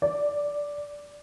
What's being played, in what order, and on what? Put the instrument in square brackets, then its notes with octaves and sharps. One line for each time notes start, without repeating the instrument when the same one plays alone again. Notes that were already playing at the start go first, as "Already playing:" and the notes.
[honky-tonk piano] D5